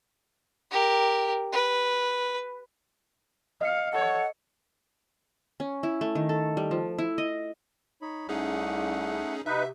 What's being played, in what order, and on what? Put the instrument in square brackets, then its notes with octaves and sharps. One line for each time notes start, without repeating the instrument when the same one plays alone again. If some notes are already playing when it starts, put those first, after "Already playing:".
[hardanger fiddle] G4 A#4
B4
[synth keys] D#5 C#7 [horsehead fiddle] F5
[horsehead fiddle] A4 C#5 [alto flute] F#5
[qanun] C#4
E4
A3
D#3
A4
G3
F3
E4
D#5
[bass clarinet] D#4 [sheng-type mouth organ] C#5 B5
[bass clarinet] C2 [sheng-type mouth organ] A3 F#5 [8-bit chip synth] C#4 D#4 G#4
[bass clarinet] C3 [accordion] D#4 B4 [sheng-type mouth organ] F#4 [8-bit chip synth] E5